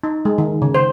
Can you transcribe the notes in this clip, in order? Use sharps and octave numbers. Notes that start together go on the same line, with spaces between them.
D#4
G#3
D#3
C#3
C5